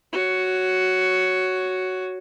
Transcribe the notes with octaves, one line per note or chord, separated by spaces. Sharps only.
F#4 C#5